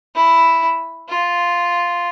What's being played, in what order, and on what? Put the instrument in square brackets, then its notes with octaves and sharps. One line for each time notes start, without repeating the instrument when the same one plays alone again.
[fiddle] E4
F4